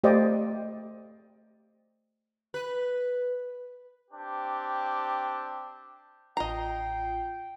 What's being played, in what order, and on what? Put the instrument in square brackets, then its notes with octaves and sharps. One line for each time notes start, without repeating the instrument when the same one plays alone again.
[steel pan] A3 G4 C5 D5 D#5 F5
[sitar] B4
[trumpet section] C4 D4 G4
[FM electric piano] A1 F4 C7 [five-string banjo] D#5 A#5 [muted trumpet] G5